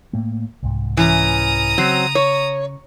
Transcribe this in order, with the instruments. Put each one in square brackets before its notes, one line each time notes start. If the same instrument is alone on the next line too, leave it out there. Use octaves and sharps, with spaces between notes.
[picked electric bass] A2 A3 A#3
C2 G#2
[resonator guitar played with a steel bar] E3 C#4 [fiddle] A#5 D#6
[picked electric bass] C#3 [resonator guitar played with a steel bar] F#3 C4
[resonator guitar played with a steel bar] C#5